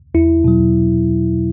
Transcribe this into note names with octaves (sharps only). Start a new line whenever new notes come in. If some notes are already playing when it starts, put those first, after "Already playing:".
E2 E4
B2 F#3